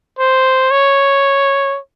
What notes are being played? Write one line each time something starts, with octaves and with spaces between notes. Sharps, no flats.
C5
C#5